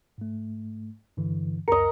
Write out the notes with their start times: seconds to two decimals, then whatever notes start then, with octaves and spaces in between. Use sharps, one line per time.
0.18 G#2 A3
1.17 G2 D3 E3
1.68 C#2 F#2 A#4 D#5 C#7